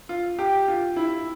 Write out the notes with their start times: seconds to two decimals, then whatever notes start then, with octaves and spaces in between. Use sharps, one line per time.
0.09 F4
0.39 G4
0.68 F4
0.96 E4